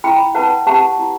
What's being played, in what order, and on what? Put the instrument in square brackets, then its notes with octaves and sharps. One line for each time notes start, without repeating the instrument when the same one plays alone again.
[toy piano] E4 G5 B5
B4 F#5 A5
G4 F#5 A5
E4